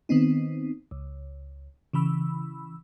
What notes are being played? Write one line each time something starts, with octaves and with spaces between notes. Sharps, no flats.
D#3 B3 C4 D#4
C#2
C#3 E3 B5 E6